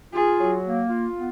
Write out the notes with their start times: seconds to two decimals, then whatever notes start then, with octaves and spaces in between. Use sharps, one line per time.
0.14 F4 G#4
0.40 F#3
0.65 A#3
0.90 F4
1.15 B3